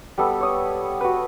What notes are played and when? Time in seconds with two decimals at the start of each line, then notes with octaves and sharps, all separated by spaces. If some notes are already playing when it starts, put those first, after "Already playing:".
0.18 G3 B3 A4 B5
0.40 C#5 D#6
1.01 F#4 B4